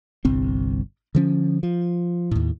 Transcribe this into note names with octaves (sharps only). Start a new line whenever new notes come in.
G1 C2 C4
D3 F3 C#4
F3
D#2 A2